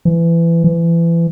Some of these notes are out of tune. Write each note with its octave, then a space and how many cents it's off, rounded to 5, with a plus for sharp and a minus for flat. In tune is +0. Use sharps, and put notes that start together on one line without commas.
E3 +25
E3 +30